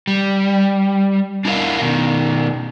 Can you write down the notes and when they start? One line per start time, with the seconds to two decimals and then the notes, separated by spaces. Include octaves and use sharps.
0.07 G3
1.45 D4 E4 A#4 B4 D#5 F5
1.81 B2 D#3